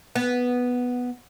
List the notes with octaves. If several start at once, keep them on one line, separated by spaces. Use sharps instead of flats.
B3